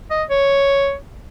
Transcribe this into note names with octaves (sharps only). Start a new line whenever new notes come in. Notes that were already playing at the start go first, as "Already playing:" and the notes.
D#5
C#5